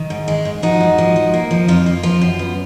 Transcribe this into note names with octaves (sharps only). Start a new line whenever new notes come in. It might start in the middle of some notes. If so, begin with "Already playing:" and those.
Already playing: D#3
G#2
G#3
G#2
F3 D#4 F#4
G#2
F3
F3
A#3
F3
F2 F4
A#3
F3 F4
F#2
B3